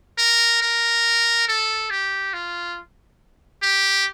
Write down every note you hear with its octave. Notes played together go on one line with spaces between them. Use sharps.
A#4
A#4
A4
G4
F4
G4